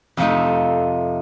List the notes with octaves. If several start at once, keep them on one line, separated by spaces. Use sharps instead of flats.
F2 C3 F3 A3 D#4